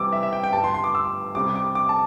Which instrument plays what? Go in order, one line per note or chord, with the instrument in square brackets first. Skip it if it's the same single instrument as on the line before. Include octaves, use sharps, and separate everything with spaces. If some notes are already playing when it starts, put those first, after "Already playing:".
Already playing: [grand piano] C2 C3 E3 G3 D6 E6
E5
E5
G5
G5
G1 G2 G3 A5
C6
C6
D6
E6
C2 C3 G3 D6
D6
D6
A5